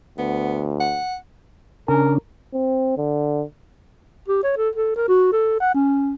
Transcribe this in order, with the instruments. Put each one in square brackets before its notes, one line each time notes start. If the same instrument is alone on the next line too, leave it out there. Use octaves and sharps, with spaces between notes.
[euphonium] D2 [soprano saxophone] B3
[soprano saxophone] F#5
[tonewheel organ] C#3 C#4 D4 [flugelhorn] A#4
[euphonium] C4
D3
[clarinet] G4
C#5
A4
A4
A#4
F#4
A4
F#5
C#4